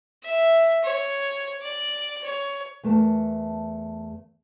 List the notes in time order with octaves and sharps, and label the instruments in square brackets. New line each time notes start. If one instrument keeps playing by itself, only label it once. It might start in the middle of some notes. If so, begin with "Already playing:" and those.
[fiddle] E5
C#5
D5
C#5
[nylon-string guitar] E2 A3 A#4 A5